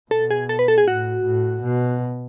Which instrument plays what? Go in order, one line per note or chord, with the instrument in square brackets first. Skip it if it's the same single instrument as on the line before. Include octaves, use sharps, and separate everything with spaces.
[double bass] B2 [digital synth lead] A4
[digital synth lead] G#4
A4
B4
A4
G#4
[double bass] A2 [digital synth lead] F#4
[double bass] A2
B2